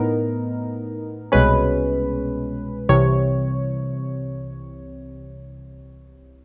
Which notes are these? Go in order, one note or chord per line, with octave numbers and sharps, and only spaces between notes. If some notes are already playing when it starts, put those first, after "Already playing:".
Already playing: A2 B3 D#4 A#4
C2 B2 G#3 C#4 B4
C2 C3 E3 C#5